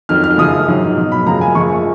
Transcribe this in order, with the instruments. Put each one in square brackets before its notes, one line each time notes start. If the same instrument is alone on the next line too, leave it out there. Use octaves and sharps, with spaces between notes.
[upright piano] F2 D#3 F#3 F6
F6
F#2 C#3 F3 G#3 D#6
G#2 F#3
B2 F#3
B5
F#2 C#3 F3 G#3 A#5
G#5
F#2 F3 G#3 C#6